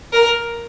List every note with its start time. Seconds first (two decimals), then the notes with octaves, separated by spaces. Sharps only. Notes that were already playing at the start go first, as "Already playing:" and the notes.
0.12 A#4